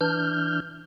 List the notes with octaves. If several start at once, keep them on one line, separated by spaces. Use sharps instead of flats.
E3 D4 F6 G6